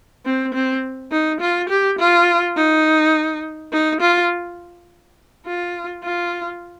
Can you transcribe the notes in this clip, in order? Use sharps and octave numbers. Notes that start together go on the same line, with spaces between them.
C4
C4
D#4
F4
G4
F4
D#4
D#4
F4
F4
F4